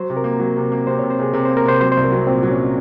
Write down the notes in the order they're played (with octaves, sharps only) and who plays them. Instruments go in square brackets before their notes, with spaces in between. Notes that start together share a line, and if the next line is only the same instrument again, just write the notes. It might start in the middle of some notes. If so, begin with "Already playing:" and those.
Already playing: [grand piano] F#3 [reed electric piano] C5
[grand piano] C3
[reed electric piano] A#4
[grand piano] A#3
F#3
C3
A#3
[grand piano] C3 [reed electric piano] C5
[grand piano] C3 [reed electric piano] C#5
[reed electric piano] C5
[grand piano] C3 [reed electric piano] G#4
[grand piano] C3 [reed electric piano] A#4
[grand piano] A#3 [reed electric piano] C5
[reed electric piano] A#4
[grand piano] C3 [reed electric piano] C5
[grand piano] F#3 [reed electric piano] C5
[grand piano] C2 [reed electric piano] C5
[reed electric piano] A#4
[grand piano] F#3 [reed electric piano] C4
[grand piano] A#2 [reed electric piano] C4
[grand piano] F#3
[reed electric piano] C#4